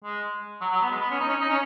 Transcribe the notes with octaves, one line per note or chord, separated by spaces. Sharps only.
G#3
F#3
F#3
B3
G#3
B3
C#4
D#4
C#4
D#4
C#4